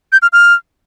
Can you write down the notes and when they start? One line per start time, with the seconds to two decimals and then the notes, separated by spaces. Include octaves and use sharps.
0.12 G6
0.22 F6
0.33 F6